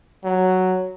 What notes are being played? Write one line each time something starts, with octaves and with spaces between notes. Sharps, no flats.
F#3